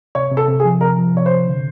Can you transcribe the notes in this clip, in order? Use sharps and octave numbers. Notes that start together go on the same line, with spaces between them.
C3 C#5
C3
A4
C3
G#4
F3
C3 A#4
F3
C3 C#5
C3 C5
D3